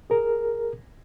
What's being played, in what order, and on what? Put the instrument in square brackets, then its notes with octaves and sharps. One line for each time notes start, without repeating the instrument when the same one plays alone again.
[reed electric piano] G#4 A#4